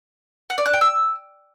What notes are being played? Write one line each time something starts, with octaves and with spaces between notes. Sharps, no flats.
F#5
D5
F#6
G5
E6